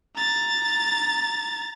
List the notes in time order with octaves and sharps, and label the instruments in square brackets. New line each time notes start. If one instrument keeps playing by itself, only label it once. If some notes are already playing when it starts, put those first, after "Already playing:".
[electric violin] A#5 A6